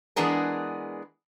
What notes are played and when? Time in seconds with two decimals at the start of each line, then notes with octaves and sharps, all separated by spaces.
0.16 E3 G#3 B3 D4 G#4 A#4